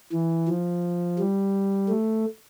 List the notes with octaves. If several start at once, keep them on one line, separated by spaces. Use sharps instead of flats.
E3
F3
G3
A3